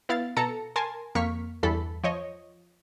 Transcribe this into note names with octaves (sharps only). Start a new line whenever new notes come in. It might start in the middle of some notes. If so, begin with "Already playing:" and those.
B3 E4 F5 A6
B2 A4 A5 A#5 C#7
A#4 G#5 A5 C6
F2 A#3 C#6 F6 B6
E2 G2 E3 A4 B5
F3 C#5 D#5